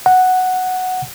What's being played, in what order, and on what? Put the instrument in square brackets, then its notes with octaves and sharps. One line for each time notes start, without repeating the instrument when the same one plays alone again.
[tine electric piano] F#5